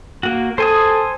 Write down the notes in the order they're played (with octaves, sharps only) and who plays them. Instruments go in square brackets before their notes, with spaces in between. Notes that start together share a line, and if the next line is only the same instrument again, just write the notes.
[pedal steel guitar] A#3 F#4
[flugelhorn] A4 [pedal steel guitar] C5 G#5 D#6